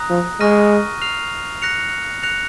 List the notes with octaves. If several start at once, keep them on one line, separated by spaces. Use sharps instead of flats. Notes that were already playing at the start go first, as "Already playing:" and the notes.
Already playing: A#5 D#6 F#6 A#6
F3
G#3 C#6 F6 A#6 D#7
F6 C7 F7
F#6 A#6 C#7 F7
F#6 A#6 C#7 F7